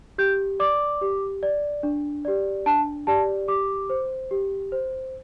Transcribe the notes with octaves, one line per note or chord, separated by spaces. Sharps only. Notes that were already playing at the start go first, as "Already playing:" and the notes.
G4 G6
D5 D6
G4
D5
D4
G4 D5
D4 A5
G4 D5 A5
G4 D6
C5
G4
C5